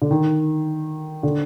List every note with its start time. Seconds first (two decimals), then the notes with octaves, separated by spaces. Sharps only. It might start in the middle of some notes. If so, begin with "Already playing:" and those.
0.02 D3
0.11 D#3
1.23 D3